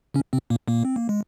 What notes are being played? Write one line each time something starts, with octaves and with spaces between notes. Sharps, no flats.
C#3 C#4
C3 C4
A#2 A#3
A#2 A#3
C4
A#3
G#3